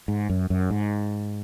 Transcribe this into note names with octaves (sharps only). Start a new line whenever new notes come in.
G#2
F#2
F#2
G#2